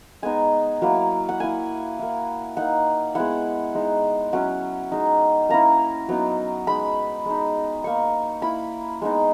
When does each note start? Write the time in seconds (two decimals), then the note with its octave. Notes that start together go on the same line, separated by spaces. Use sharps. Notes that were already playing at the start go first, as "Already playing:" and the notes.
0.23 G#3 B3 D#4 G#5
0.82 F#3 A#3 E4
1.29 F#5
1.40 A#3 E4 G#5
1.99 A#3 E4
2.57 A#3 D#4 F#5
3.15 G#3 B3 E4 F#5
3.75 G#3 D#4
4.33 F#3 C#4 E4 F#5
4.92 G#3 D#4
5.49 A#3 C#4 E4 A#5
6.08 F#3 B3 D#4
6.67 G#3 D#4 B5
7.26 G#3 D#4
7.84 A#3 D#4 C#6
8.42 A#3 E4 B5
9.02 G#3 B3 D#4